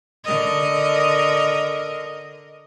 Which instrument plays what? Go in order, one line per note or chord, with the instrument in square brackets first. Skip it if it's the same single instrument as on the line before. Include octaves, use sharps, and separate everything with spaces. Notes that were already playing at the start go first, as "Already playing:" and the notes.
[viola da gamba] D3 A#4 D#5